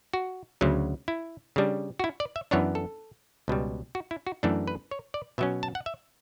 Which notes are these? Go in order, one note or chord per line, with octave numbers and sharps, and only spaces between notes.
F#4
D2 C#3 F#3
E4
C#3 G3 D4
F#4
E4
D5
E5
F#2 E3 B3 D4 C#5
A4
C#2 B2 G3
F#4
E4
F#4
F#2 E3 A3 D4 A4
B4
C#5
D5
B2 F#3 C#4 E5
A5
F#5
E5